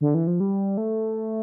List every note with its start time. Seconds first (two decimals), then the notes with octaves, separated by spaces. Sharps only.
0.01 D3
0.15 E3
0.27 F3
0.40 G3
0.77 A3